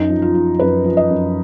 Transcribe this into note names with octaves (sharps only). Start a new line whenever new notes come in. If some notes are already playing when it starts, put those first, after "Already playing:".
Already playing: F#2 D#4
F3
F4
F3
F#2 B4
F3
D#5
F#2